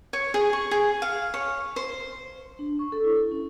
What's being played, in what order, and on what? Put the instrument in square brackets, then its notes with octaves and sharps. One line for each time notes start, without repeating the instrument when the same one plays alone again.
[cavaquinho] C#5
G#4
C#6
G#4
F5
C#5
C5
[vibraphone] D4
C#6
A4
E4
C#4